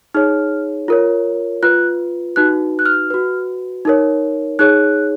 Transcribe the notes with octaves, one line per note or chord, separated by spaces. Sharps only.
D#4 G#4 C#5 F6
F4 A#4 C#5
F4 B4 F#6
D#4 F#4 B4 F#6
F#6
F6
F#4 B4
D#4 A#4 C#5
D#4 G#4 C#5 F#6